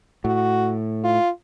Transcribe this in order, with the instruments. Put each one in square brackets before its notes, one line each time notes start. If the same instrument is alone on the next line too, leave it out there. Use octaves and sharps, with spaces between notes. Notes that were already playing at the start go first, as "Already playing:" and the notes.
[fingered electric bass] A2 [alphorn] F#4
[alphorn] F4